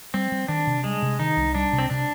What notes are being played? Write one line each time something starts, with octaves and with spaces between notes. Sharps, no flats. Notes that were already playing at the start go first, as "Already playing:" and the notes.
G3 C4
G3
D#3 D4
C3
G3 G#3
C3
D#3 D#4
C2
G3 D4
C3
C4
C3 D4